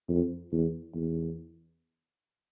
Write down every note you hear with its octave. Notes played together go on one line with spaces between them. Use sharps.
F2
E2
E2